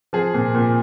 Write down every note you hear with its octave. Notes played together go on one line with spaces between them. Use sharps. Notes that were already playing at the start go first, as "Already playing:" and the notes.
F3 G#4
A#2
A#2